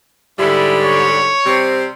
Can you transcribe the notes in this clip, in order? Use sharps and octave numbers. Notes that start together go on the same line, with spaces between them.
G#2 D3 G3 E4
C#5
C3 G3 C4